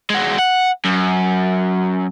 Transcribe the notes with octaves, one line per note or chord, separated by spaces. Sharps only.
G#3 F#4
F#5
F#2